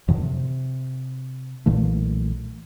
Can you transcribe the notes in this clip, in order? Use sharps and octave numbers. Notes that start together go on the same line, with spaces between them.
F2 A2 D3 D#3
C3
B1 A#2 E3 A3